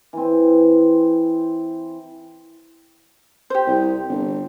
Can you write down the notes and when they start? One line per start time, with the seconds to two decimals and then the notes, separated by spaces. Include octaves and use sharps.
0.13 E3 C4
3.50 G4 C5
3.67 C2
4.09 G1